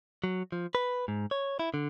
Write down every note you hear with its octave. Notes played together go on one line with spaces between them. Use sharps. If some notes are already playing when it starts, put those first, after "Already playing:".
F#3
F3
B4
G#2
C#5
E4
D3